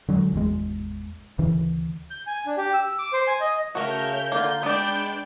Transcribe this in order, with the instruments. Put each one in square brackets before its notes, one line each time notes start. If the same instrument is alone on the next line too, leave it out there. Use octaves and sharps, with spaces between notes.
[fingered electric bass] D3 F#3 G#3
G#1 E2 B2 G#3
D2 C#3 E3
[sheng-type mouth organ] G6
G#5
D4
G4
E6
D6
C5
G#5
D#5
[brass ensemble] C#3 [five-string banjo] A3 F#4 [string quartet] A#4 C#5 E5 [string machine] G6
[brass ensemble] D3 [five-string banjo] A#3 F4
[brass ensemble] G#3 [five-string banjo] B3 D5 [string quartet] D4 G5 A5